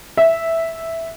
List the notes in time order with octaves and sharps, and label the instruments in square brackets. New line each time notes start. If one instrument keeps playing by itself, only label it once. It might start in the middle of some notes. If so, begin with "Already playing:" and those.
[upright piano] E5